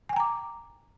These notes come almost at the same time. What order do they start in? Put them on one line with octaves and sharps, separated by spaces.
G#5 G5 A#5 D6